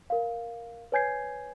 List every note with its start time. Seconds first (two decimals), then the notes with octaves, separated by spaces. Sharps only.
0.10 A#4 F5
0.92 B4 C#5 G#5 G6 G#6 C7